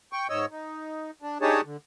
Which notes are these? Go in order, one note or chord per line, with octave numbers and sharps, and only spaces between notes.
G5 C#6
G#2 C#5 D#5 E6
D#4
D4
D4 D#4 G4 G#4 C#5 A5
D3